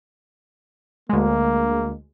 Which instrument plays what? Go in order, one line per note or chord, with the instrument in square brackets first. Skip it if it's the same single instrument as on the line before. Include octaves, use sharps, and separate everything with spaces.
[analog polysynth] D2 G#3 [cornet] A#3